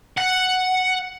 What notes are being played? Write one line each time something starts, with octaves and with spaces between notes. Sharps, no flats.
F#5